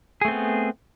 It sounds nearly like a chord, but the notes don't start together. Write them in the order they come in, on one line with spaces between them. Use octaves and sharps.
G#4 A3 C4 B3